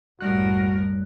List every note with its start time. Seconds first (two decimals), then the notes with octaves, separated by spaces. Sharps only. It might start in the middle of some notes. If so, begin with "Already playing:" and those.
0.21 F#1 C2 A2 G3 F#4 A#4 F#6